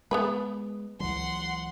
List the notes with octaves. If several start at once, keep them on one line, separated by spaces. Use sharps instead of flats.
G#3 B3 G#4 B4
C#2 E3 F#3 F#5 C6